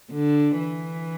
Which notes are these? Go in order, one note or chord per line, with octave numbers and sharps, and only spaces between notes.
D3
E3